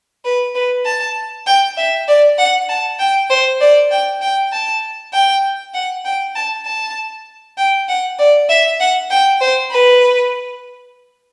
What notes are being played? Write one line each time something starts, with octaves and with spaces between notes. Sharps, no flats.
B4
B4
A5
G5
E5
D5
F#5
A5
G5
C5
D5
G5
G5
A5
G5
F#5
G5
A5
A5
G5
F#5
D5
E5
F#5
G5
C5
B4